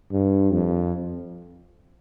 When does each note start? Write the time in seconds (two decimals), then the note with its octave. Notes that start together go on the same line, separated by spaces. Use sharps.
0.12 G2
0.52 F2